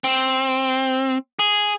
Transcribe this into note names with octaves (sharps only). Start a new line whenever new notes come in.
C4
G#4